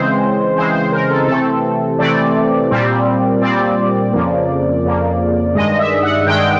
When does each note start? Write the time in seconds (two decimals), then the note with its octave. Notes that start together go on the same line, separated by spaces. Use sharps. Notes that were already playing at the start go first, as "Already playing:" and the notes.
Already playing: C#3 E3 G#3 C4 C5
0.56 C#3 E3 G#3 C4 C5
0.74 C5
0.92 A#4
1.09 A4
1.28 C3 E3 A3 C4 A4
1.99 C3 E3 A3 C4 D5
2.71 A#2 G3 C4
3.41 A#2 G3 C4 D5
4.13 F2 C#3 F3 A#3
4.84 F2 C#3 F3 A#3
5.55 G2 D#3 G#3 D#5
5.79 E5
6.03 F#5
6.26 G2 D#3 G#3 G5